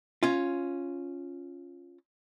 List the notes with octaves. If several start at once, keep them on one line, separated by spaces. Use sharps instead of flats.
C#4 F4